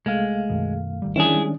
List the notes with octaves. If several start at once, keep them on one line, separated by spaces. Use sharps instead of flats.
C2 G#3 A3 F5
F#2 B2 D#3
G#1 D#3 G3
D#3 E3 G3 C#4 D4 E4 G#4
G3 G#3